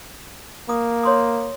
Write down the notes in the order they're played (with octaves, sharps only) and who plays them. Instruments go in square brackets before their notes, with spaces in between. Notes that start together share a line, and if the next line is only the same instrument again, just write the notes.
[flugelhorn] A#3 [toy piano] D#6
[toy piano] C#5 C6 D#6